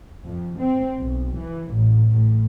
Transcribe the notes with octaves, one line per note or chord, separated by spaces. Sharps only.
F2
C4
B1
E3
A1
A2